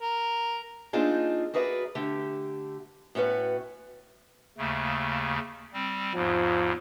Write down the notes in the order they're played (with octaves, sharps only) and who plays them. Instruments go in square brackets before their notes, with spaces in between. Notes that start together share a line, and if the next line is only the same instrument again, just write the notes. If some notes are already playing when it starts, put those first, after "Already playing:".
[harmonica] A#4
[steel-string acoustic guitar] A#3 C4 D4 D#4 F4 G#4
F#4 G#4 A#4 B4 D5 E5
D3 A3 G4
A2 C#4 F#4 B4
[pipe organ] D#2 C#3 A3
G3 C4
[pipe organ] E2 G#2 [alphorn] F3